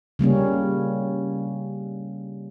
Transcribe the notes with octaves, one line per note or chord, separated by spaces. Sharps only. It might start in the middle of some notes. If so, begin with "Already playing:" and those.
C#3 G3 A#3 C#4